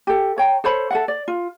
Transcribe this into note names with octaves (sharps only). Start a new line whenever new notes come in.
G4 A4
C#5 G5 A#5
A4 C5 C#5 B5
A4 E5 F#5
D5
F4